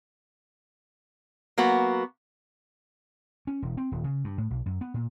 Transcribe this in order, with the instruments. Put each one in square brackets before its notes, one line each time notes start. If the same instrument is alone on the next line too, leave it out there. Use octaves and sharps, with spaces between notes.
[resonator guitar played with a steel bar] F#3 A#3 B3 F#4
[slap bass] C#4
E1
C4
D#1
C#3
G2
A2
B1
F#2
B3
A#2